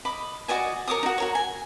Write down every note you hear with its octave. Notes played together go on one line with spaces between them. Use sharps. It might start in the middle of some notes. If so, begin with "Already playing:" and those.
D#5 B5 D6
F#4 D5 D#5 G#5
A#4 C#5 D6 D#6
D#4 F#4
F#4 A#4 C#5
G#5